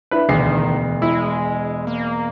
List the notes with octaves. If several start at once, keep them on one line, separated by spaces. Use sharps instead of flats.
D4 E4 B4
E1 D2 D#3 C7
G#3 E4
A#3